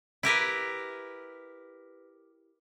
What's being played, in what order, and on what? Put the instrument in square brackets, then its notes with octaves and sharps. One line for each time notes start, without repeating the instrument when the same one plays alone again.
[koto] E4 G4 A#4 B4